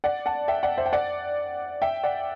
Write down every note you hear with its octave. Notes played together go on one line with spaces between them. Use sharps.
D5 F#5
F#5 A5
E5 G5
D5 F#5
C5 E5
G5
D5 F#5
E5 G5
D5 F#5